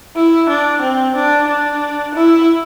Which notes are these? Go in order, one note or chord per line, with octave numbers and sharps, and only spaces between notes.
E4
D4
C4
D4
D4
E4